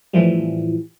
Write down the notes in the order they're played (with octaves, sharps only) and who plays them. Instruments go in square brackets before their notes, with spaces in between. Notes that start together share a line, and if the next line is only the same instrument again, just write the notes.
[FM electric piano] F2 A2 E3 F3 G3